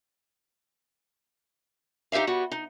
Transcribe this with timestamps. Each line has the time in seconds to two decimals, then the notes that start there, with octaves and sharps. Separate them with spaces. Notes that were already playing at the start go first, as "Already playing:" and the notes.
2.12 D#4 G4 C5 E5 F5
2.27 G3 B3 F#4
2.52 D#4